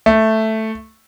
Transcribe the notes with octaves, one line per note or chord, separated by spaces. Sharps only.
A3